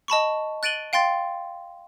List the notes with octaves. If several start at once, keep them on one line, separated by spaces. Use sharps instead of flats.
D#5 A5 B5 C#6
F#6 A6 D7 D#7 F#7 G7
F5 G5 C6 A6